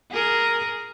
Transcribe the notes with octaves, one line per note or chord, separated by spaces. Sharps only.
G#4 A#4